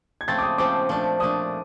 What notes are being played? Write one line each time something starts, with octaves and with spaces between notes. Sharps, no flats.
G#6
C#3 F3 A3 C4 A6
D6
D#6
C#3 F3 A3 C4 D6
A#2 F3 A3 D4
A#2 F3 A3 D4 D#6